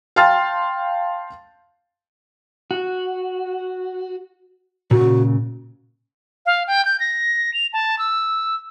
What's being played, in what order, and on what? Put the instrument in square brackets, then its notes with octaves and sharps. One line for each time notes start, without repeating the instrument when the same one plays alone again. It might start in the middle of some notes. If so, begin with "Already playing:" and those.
[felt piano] F5 G5 A5 C6 F6 A6
[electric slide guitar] F#4
[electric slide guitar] A#2 C#3 [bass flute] F#4
[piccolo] F5
G5
G6
A#6
F7
A5
E6